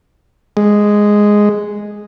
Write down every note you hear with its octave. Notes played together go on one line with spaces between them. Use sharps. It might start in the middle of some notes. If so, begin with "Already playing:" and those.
G#3